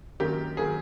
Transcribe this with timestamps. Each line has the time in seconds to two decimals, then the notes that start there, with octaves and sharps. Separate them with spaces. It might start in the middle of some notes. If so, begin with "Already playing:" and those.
0.20 F#2 D#3 F#3 A#3 G4
0.57 D#3 F#3 A#3 G#4